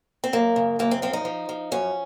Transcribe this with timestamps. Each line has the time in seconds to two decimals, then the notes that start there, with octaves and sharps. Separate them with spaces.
0.24 C4
0.33 F#2 A#3
0.56 C#3
0.79 F#2 A#3
0.91 C4
1.02 F3 C4
1.13 D#4
1.25 F3
1.49 F3
1.72 F#2 C#4